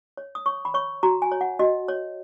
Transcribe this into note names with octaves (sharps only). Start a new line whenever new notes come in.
C#5
D#6
C#5 C#6
B5
C#5 C#6
F#4 A#5
G#5
C#5
F#5
F#4 D#5
C#5